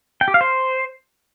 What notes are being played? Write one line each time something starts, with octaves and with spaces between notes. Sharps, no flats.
G5
G4
F5
C5